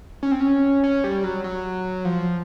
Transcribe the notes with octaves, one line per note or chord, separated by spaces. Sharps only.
C#4
C4
C#4
C#4
G3
F#3
F#3
F3